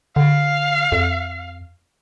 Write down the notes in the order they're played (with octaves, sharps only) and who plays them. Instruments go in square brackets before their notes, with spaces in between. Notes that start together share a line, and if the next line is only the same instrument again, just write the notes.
[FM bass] D3 [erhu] F5
[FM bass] F2